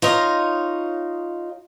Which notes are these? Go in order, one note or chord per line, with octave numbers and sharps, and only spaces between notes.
D#4 F4 C#5 D#5